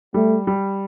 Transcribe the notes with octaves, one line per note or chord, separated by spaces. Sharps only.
G3 A3
G3